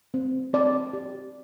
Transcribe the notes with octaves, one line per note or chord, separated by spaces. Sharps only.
C4
C4 D5
G4